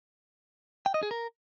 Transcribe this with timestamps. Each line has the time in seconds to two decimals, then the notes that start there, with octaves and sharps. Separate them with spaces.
0.86 G5
0.94 D#5
1.03 G#4
1.11 A#4